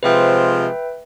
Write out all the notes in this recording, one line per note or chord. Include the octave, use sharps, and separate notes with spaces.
C3 F3 G#3 B4 E5 G5